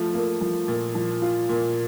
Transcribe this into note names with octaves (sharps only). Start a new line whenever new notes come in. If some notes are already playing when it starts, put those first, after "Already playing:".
Already playing: F3 A3
A#3
F3
A#2
F3
F4
A#2